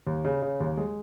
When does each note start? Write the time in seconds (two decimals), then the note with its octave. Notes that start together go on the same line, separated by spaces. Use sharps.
0.07 D#2
0.25 C#3
0.42 C#3
0.60 D#2
0.77 G#3